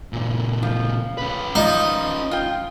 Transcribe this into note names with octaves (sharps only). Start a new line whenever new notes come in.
A#2 C#3
F3
C#4 B4
F3 D#4
F4 G5